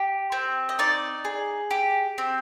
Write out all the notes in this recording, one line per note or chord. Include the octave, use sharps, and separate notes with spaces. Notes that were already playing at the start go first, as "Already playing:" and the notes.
Already playing: G4
C4
D#5
D#4 D5
G#4
G4
C4